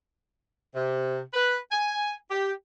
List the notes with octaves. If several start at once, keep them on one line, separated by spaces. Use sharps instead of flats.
C3
B4
G#5
G4